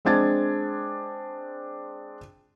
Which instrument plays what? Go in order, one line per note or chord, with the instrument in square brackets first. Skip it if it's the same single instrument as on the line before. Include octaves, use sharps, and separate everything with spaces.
[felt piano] G#3 C4 D4 G#6 A6